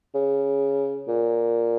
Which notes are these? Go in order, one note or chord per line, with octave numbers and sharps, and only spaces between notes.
C#3
A#2